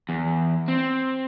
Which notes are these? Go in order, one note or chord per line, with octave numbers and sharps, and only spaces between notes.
E2
C4